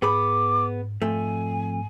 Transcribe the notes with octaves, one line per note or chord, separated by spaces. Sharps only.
G#2 B3 G#4 B5 D6
F2 G#2 A3 G#5